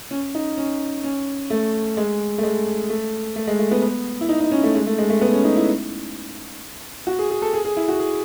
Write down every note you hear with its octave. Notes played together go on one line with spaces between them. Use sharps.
C#4
D#4
C#4
C#4
A3
G#3
A3
G#3
A3
A3
G#3
A3
B3
B3
E4
D#4
D#4
C#4
A3
G#3
A3
G#3
A3
B3
C#4
D#4
E4
F#4
G#4
G#4
A4
G#4
G#4
E4
F#4
G#4